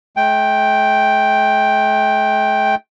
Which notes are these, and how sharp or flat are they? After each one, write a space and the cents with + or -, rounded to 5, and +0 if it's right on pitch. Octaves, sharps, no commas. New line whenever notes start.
A3 -45 G5 +0